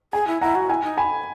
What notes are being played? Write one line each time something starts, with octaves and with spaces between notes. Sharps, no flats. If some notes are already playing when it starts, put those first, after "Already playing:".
G#4 G#5
E4
E4 F#5 A#5
F#4
E4 G#5
D#4
G#5 B5